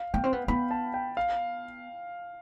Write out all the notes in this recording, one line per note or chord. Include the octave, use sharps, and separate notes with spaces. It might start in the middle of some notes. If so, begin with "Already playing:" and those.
Already playing: F5
B3 G5
C4
B3
B3 B5
A5
G5
F5